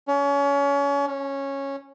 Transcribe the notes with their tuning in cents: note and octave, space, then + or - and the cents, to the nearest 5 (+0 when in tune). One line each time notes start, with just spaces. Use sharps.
C#4 +30
C#4 -10